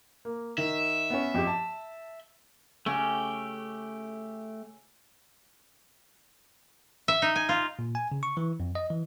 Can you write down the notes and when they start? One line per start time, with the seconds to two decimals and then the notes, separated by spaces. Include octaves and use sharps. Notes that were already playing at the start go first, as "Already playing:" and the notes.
0.25 A#3
0.58 D#3 E5
1.10 B3 C#4
1.34 F2 G4
1.47 A5
2.86 C#3 A3 C#4 G4 G5
7.08 E5
7.22 D#4
7.36 G#5
7.49 F4
7.79 A#2
7.95 G#5
8.12 C#3
8.23 C#6
8.37 E3
8.60 F2
8.75 D#5
8.91 E3